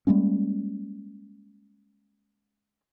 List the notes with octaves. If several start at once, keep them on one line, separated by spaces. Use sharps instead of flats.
G3 G#3 A#3 C#4